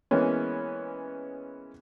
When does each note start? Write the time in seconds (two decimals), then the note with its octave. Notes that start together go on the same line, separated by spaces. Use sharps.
0.11 E3 G#3 A#3 B3 C#4